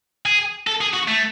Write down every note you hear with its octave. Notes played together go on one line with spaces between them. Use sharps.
G#4
A4
G#4
F#4
A3